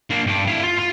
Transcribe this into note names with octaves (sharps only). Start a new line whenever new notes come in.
A#3 D4
G2 D4
E4 F5
F4
F4